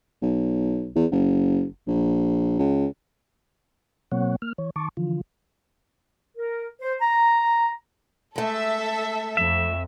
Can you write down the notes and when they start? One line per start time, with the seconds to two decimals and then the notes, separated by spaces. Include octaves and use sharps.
0.22 B1
0.95 E2
1.11 F#1
1.87 A#1
2.59 C#2
4.12 B2 F#3 A#3 C4 C#5 F#5
4.42 A#3 F6
4.58 E3 C#5
4.76 D#3 A5 C#6 D6
4.97 D3 E3 F3 F4
6.37 A#4
6.82 C5
7.01 A#5
8.36 G#3 A3 A4 E5
9.37 F2 E5